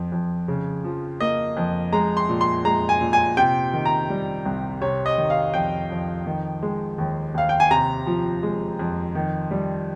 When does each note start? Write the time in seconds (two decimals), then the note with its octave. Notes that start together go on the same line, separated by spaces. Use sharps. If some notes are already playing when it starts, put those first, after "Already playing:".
Already playing: F2 F3
0.12 F2
0.48 C#3
0.84 F3
1.20 A#3 D#5
1.57 F2
1.93 G#3 A#5
2.17 C6
2.29 A#2
2.41 C6
2.65 G#3 A#5
2.89 G#5
3.01 A#2
3.13 G#5
3.37 C3 G5
3.73 D#3
3.86 A#5
4.10 G3
4.46 C2
4.81 C3 C#5
5.06 D#5
5.18 D#3
5.30 F5
5.54 F2 G5
5.90 F2
6.26 D#3
6.63 G#3
6.98 D#2
7.34 D#2 F5
7.49 G5
7.60 G#5
7.71 C3 A#5
8.07 F3
8.43 G#3
8.79 F2
9.15 D#3
9.51 G3